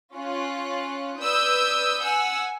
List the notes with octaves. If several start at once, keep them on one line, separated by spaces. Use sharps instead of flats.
C#4 F4 F#6
B4 D5 D#6 E6 G6
F#5 G#5 E6